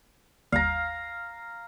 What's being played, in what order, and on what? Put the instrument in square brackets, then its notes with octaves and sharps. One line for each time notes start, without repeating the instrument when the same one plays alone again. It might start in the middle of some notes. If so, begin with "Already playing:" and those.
[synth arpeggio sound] G1 D#2 G3 [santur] F5 A#5